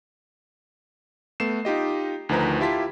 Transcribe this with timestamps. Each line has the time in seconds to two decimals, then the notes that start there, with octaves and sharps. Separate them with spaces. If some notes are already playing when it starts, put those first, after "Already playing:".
1.40 A3 B3 C7 E7
1.65 D#4 F4 G4 D#5
2.29 D2 D#3 F3 B4 A#5
2.60 E4 F4 G4 A5 C6 B6